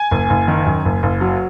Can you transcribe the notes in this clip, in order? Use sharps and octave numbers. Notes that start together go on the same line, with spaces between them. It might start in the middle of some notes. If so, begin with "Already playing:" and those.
Already playing: G#5
F#1
F#1
D#3
F#2
F#1
F#1
F#3